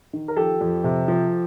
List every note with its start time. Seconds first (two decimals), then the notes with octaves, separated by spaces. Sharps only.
0.13 D#3
0.28 A#4
0.36 F3 G4 A4
0.61 F2
0.84 C3
1.08 F3